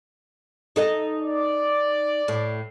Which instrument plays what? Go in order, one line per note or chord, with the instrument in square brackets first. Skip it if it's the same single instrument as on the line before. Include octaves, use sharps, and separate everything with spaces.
[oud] D#4 A4 D#5
[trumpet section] D5
[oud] A2